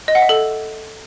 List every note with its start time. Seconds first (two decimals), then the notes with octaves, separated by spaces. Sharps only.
0.08 D#5
0.15 F#5
0.22 E5
0.29 A4